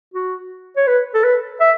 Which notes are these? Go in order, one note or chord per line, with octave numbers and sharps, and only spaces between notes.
F#4
C#5
B4
A4
B4
E5